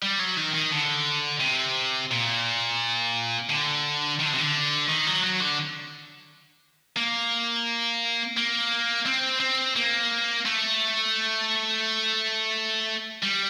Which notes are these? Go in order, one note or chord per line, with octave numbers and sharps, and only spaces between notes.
G3
F#3
D#3
D#3
D3
C3
A#2
D3
D#3
D3
C3
D3
D#3
F#3
F#3
D3
A#3
A#3
C4
C4
A#3
A3
G3